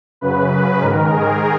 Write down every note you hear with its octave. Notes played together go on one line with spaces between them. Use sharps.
F#2 C#3 B4
G#2 D#3 A#4
G#4